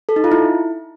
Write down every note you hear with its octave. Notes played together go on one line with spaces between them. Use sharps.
A4
D#4
F4
E4